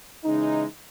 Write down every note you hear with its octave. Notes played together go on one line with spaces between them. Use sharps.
C#3 E3 G#3 D#4